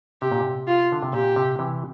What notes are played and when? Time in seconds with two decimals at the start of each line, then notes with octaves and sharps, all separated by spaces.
0.22 C3 G4
0.32 A#2
0.41 C3
0.67 F4
0.92 D3
1.03 C3
1.13 A#2 G4
1.36 C3
1.59 C3 E3